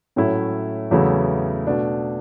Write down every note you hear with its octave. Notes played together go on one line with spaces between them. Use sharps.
A2 F#3 A3 C#4 E4
E2 C#3 F#3 A3 E4
B2 A3 D4